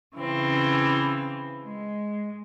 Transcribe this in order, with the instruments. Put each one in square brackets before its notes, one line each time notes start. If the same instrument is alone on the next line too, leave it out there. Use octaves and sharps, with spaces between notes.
[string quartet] C#3 E3 C4
G#3